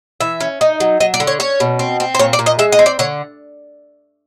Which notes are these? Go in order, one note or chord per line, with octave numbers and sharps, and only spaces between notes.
E3 E5
C#4
D#4
F#3
F#3 D#5
D5
D3
C#5
C#4 C#5
B2
C4
C4
C5
A#2 C#5
D5
A#2
D#5
G#3 E5
D#5
C4
D5
D3 C#5